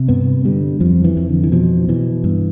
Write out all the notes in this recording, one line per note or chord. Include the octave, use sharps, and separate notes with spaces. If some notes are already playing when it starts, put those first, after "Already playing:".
Already playing: C3
G2 B3
D3 G3
F2 F3
E3
F2
D3
E3
B2 F3
B2 E3
G2